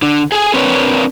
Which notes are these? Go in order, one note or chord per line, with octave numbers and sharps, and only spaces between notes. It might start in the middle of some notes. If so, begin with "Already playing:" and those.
D3 D4
G#4 A4 G#5
C4 D4 A#4 B4 C#5